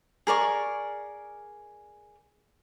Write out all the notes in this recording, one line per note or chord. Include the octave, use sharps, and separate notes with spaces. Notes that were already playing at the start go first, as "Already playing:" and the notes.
G#4 A#4 D5 C#6